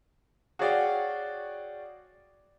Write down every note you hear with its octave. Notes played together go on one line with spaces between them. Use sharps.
F#4 G#4 C#5 D5 F5 G5